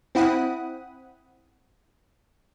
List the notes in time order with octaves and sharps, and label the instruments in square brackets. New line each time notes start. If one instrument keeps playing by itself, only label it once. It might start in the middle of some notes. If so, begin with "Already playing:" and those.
[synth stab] C4 E4 F#5 B5 D#6